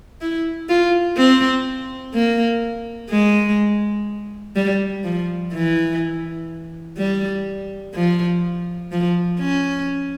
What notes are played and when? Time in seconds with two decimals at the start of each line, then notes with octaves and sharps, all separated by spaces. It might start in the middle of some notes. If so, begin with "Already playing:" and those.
0.21 E4
0.69 F4
1.17 C4
2.14 A#3
3.10 G#3
4.56 G3
5.04 F3
5.53 E3
6.98 G3
7.94 F3
8.92 F3
9.40 C#4